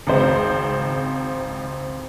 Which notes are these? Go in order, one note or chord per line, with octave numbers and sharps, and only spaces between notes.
G#1 C#2 C4 C5